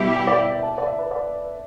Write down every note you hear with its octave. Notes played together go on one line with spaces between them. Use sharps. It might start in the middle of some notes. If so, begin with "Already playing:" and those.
Already playing: B2 G3 E4 G4 E5
G5
D5
E5
E5
A5
D5
E5
B4
D5